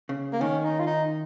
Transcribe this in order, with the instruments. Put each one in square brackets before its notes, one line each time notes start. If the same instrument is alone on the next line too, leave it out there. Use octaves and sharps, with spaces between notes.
[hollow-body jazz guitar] C#3
[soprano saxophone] A#3
[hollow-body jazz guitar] D#3 [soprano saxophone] C#4
[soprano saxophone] D#4
F4
D#4